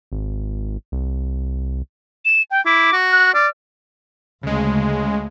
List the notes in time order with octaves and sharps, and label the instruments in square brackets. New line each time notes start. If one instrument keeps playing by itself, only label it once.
[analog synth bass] G#1
C2
[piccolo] E7
G5
[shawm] E4 [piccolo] D6
[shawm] F#4
[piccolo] F#6
[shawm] D5 [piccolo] F6
[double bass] D2 A3 [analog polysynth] C#3 G#3